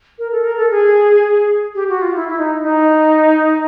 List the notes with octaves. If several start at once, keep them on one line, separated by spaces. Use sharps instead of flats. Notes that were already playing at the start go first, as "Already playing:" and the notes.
A#4
A4
A#4
A4
G#4
G4
F#4
F4
E4
E4
D#4
D#4